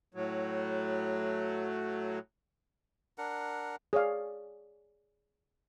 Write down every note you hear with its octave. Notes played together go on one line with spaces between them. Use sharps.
A2 F#3
D4 A#4 F#5
G#4 C#5 D5 F5